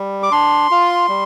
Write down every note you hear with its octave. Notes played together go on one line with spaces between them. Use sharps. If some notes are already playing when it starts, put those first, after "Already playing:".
Already playing: G3
D6
D4 C6
F4
G3